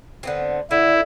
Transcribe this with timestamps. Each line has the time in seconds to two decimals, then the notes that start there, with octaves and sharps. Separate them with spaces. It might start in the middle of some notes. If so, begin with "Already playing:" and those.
0.23 D3 B3 C4
0.71 D3 E4